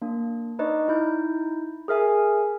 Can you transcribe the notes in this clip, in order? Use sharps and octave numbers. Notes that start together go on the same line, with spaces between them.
A#3 D4
D4 D#4 B4 D5 D#5 C#6
D#4 E4 G6
G#4 A#4 E5 G#5